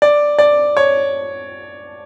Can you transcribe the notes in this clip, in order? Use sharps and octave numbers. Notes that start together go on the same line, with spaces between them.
D5
D5
C#5